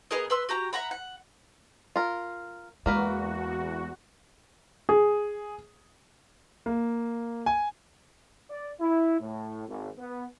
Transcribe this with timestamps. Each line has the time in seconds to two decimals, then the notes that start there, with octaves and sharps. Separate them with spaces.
0.11 B3 G#4 A#4 D#5
0.30 B4 C6 E6
0.49 F#4 G4 A#5
0.73 E5 F#5 A#5 B5
0.91 F#5
1.96 F4 A#4
2.86 E2 G#3 A#3 F#4 A#4 B4
4.89 G#4
6.66 A#3
7.46 G#5
8.50 D5
8.80 E4
9.20 A2
9.68 G#1
9.98 B3